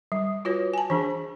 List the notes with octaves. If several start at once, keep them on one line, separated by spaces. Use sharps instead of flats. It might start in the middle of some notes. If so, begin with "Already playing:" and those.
G3
F4 F#4 B4 C#5
G#5 A5
E3 D4 G#4